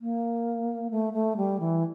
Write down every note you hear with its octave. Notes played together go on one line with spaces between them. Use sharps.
A#3
A3
A3
G3
E3